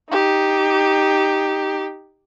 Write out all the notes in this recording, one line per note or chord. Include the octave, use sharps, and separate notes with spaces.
D#4 G4